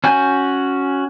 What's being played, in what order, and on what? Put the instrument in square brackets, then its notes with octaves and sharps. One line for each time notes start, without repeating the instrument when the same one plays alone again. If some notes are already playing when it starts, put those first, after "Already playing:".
[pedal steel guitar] C#4 F#4 G#5 G6